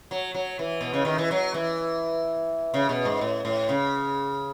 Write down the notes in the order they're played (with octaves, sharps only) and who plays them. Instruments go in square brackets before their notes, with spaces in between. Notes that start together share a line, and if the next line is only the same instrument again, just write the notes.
[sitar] F#3
F#3
E3
B2
C#3
D#3
E3
F#3
E3
C#3
B2
G#2
A2
A2
C#3